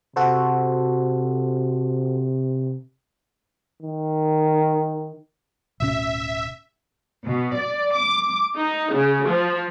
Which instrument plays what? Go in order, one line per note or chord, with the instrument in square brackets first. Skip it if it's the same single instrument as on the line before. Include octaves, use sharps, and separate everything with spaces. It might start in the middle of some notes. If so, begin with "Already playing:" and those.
[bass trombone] C3 [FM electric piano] F#4 A4 C5
[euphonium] D#3
[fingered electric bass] D1 B2 C#4 [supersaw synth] E5
[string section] B2
D5
D6
D#4
C#3
F3